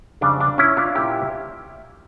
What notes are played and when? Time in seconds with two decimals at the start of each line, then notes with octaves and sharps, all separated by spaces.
0.21 F2 C#3 G3 D4
0.40 D4
0.58 C#4 E4
0.77 D4 F4
0.95 A#2 G3 A#3 C#4 E4 G4